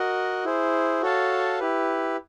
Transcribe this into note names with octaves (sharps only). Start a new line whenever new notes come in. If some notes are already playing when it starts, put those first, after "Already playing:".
Already playing: F#4 A#4 D#5 F#5
E4 G#4 C5
F#4 A4 C#5 F5 A5
E4 G4 B4